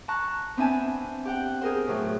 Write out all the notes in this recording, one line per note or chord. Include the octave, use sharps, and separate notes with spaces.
A5 A#5 C#6 F#6
B3 C4 D4 E5 G#5 A5
G4 F#5 G5
G#4 A#4 C5
A2 C3 F#3 A3